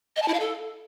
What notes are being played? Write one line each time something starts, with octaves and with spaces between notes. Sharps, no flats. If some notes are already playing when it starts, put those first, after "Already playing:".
D#5
A5
E4
F5
A4